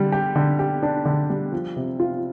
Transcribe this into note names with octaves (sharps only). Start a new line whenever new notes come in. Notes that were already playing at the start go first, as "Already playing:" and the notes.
Already playing: D3 G3
G4
D3
G4
D4
D3
G3
F3
C3
F4